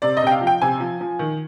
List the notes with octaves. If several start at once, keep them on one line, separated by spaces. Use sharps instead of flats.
C3 D5
D#5
C3 G5
F5
F3
G5
C3 G#5
F3
F3
D#3